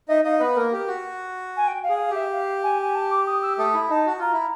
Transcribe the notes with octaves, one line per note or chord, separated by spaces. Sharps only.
D#4 D#5 E5
D#4 D#5 F5
B3 B4
A#3 A#4
G4
F#4
G#5
G5
F5
G#4
F5
G4 E5
F5
G#5
G#5
A5
D6
D#6
E6
A3 A4 D#6
E4
D#4 A5
F#4
F4 A#5
E4